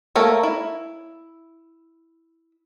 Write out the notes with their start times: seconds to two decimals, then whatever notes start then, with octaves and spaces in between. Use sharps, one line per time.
0.16 A3 A#3 A4 A#4 C#5
0.43 E4